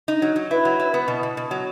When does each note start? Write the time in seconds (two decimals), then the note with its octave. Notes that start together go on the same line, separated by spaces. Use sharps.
0.08 D#4
0.22 F#3
0.36 F#3
0.51 E4 B4
0.65 F#3
0.80 E4
0.94 B3
1.08 B2
1.23 B2
1.37 B2
1.51 F#3